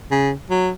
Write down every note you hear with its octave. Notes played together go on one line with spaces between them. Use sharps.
C#3
F#3